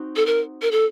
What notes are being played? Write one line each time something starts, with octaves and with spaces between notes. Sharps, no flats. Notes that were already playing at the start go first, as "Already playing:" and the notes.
Already playing: C4 D#4 F#4
A4
A#4
A#4
A4